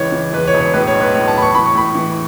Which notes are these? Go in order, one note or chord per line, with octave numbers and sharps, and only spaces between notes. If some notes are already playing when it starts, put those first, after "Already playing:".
Already playing: C#2 E3 C#5
E3
E2 B4
C#5
E1
C#5
A2 B4
C#5
B1
B4
A2 C#5
A5
A2 B5
C#6
E3 B5
C#6
A2 B5
E3